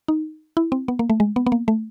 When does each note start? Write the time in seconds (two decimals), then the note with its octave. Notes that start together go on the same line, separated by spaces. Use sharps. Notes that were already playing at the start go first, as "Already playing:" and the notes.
0.08 D#4
0.57 E4
0.72 C4
0.88 B3
0.99 A#3
1.10 A3
1.20 G#3
1.36 B3
1.47 B3
1.52 A#3
1.68 A3